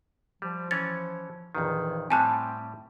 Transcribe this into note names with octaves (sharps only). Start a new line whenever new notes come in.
F3 G3
E3 C#4 C#5 A6
A#1 F2 D#3 E3
A2 G3 C4 G4 G#5 A5 F#6